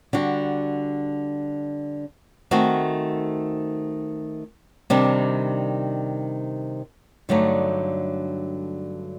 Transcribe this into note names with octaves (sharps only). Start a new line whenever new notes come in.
D3 G3 D4 F#4
D#3 A3 C4 F#4 A4
C3 D#3 G3 D4
G2 D3 F#3 A3 D#4